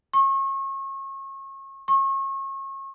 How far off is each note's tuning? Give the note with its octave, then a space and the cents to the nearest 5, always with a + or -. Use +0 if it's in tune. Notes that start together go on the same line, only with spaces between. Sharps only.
C#6 -35
C#6 -35